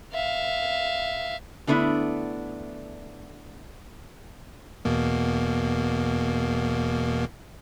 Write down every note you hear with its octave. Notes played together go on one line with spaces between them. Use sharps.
E5 F5
D3 A3 B3 D4 E4
E2 B2 A#3